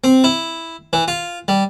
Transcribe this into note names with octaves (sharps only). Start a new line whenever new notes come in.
C4
E4
E3
F4
G3